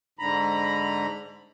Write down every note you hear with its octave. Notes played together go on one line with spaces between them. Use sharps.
G#2 D3 A#5 B5